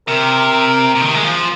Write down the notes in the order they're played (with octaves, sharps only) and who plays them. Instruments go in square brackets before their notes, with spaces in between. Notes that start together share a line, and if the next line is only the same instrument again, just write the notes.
[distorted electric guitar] C3 [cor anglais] A#4
[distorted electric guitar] C3
D#3
G#3
F3